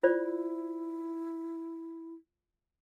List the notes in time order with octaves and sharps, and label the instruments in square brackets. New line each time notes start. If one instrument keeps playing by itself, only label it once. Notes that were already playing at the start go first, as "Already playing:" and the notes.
[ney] E4 [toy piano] F4 C5 D5